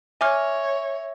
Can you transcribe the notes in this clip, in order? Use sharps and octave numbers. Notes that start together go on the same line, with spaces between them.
C#5 E5 G#5 D6 F6